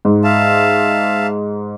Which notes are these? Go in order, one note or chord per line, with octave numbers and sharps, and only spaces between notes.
G#2
E5 F5 A5